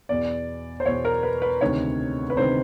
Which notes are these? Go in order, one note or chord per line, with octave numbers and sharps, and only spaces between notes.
E2 B2 D5
C5
E2 B2 C#5
A#4
B4
B4
D2 C3 D#3 C#5
B4
D2 C3 D#3 C5